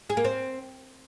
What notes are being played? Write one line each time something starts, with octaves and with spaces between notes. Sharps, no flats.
G#4
A#3
C4